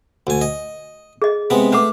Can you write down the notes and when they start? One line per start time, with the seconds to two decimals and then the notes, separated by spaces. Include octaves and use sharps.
0.27 D2 G#5
0.41 D#5
1.22 G#4 D#5
1.50 C3 G#3 B3
1.73 A3 B4 F#5 D6